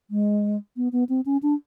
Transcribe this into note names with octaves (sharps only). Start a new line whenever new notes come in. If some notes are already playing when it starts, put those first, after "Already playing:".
G#3
B3
B3
C4
C#4
D4